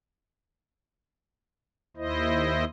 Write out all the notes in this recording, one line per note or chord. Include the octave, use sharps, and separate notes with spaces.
D#2 E4 C5 D#5